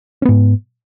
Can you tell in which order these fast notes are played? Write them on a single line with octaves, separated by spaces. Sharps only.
C#4 B3 G#2